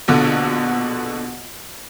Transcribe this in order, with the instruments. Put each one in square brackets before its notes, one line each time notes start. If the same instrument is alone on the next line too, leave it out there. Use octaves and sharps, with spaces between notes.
[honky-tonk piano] A#1 B2 D3